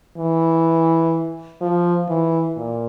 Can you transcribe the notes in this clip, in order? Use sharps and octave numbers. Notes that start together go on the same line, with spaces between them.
E3
F3
E3
A#2